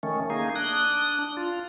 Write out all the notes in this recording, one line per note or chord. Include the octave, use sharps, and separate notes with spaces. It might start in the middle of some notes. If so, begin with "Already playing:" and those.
D#3 A3 C#4
A#3 D#4 G#4
D4 D#6 F#6
F4